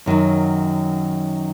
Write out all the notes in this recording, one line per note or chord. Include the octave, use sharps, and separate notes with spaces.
F#2 D#3 F#3